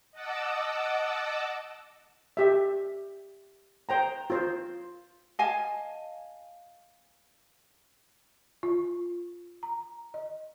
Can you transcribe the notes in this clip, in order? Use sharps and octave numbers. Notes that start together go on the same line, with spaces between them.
D#5 F#5 A5 D6 E6
G4 E5
C5 G5 A#5
F4 C5
D#5 F5 G#5 A5
F4
A#5
D#5